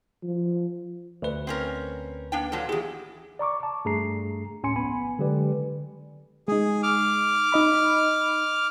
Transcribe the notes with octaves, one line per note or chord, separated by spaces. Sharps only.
F3
D2 B4
C4 C#4 A#4
A#3 D4 G5
A#2 F#3 A4
E2 E4 G4 G#4
D5 A#5 C#6 D6
A5
G2 A3 G#4 A#5 C7
D2 A2 C#4 G#5 C6 C#7
A#1 B3 G#5 B5
D3 F#3 G#3 G4 B4 D5
G#3 D#4 G#4
D6 F6
D#4 D#5 B5